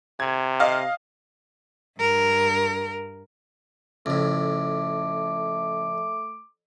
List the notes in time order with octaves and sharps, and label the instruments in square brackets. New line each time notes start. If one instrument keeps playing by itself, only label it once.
[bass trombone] C3 [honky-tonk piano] G#6
[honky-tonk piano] D#5 F5
[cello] G2 A#4
[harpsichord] F2 A2 [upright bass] C#3 [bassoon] A3 [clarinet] D6